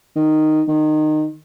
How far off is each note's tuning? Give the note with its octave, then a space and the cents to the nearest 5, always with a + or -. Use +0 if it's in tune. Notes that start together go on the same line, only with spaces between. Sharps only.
D#3 -10
D#3 -20